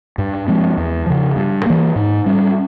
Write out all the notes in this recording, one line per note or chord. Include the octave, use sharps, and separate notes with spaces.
G2
F3 G#3 C4
E2
C#3 F3
G2
E3 A#3
G#2
G3 C#4